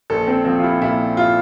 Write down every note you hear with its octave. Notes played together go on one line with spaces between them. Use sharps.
A#1 A4
C4
F3 C4
F4
E4
A#2 E4
F4